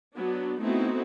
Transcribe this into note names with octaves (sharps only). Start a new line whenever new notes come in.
F#3 B3 D4
A3 B3 C4 D#4 E4 F#4